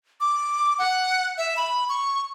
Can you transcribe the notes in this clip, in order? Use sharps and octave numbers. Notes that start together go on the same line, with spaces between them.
D6
F#5
E5
B5
C#6